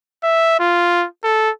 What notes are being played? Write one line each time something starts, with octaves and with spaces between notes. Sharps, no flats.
E5
F4
A4